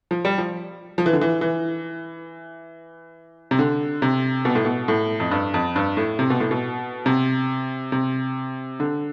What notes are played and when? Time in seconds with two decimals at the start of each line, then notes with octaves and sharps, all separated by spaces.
0.11 F3
0.25 G3
0.38 F3
0.98 F3
1.06 E3
1.13 D3
1.21 E3
1.41 E3
3.51 C3
3.59 D3
4.02 C3
4.45 B2
4.55 A2
4.65 B2
4.88 A2
5.20 F2
5.31 G2
5.54 F2
5.76 G2
5.97 A2
6.19 C3
6.30 B2
6.40 A2
6.51 B2
7.06 C3
7.92 C3
8.80 D3